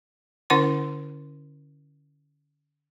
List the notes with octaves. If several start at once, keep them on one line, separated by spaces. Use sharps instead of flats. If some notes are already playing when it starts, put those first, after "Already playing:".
D3 C#4 E4 C5 F#5 C6